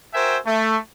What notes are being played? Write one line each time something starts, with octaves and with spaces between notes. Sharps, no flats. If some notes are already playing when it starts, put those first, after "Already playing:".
F#4 A#4 C5 E5 G5 G#5
A3